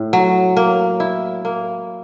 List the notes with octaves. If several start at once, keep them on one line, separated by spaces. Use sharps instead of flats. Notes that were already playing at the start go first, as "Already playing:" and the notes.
Already playing: A2
F#3
A#3
E4
A#3